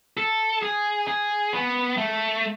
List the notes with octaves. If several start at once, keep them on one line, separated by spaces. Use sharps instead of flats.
A4
G#4
G#4
B3
A3